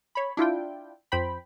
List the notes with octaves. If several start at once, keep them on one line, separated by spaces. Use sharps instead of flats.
C#5 B5
D4 E4 F4 G5
F2 C5 G5 B5